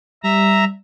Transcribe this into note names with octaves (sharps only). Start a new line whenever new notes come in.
G3 E5 A#5